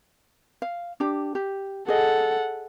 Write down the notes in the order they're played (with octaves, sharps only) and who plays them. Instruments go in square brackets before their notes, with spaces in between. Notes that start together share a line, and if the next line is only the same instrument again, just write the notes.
[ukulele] F5
D4 G4
G4
[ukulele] G#4 D#5 [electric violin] A4 F#5